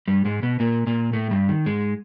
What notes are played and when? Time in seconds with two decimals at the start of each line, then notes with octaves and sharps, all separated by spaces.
0.08 G2 G3
0.25 G#2 G#3
0.43 B2 B3
0.60 A#2 A#3
0.87 A#2 A#3
1.13 A2 A3
1.31 G2 G3
1.49 D#3
1.66 G#2 G#3